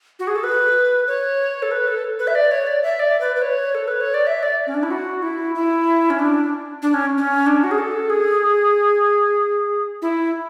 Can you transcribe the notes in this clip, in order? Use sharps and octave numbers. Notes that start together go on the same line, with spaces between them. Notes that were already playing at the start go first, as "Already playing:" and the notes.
F#4
G#4
A4
B4
C#5
A4
B4
A4
B4
E5
D5
C#5
D5
E5
D5
B4
B4
C#5
A4
B4
C#5
D5
E5
D5
C#4
D4
E4
F#4
E4
E4
C#4
D4
D4
C#4
C#4
D4
F#4
G#4
A4
G#4
E4